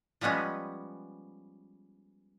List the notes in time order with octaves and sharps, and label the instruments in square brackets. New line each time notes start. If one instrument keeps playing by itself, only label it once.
[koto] F3 G3 G#3 B3 C#4